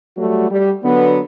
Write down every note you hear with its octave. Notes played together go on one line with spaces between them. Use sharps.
F#3 G3 A3 F#4
G3
D3 F#3 B3